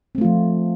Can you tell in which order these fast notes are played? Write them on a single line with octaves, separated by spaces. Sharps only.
C4 A3 F4 F3